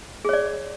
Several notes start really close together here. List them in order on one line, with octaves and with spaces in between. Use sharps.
G#4 C#5 D5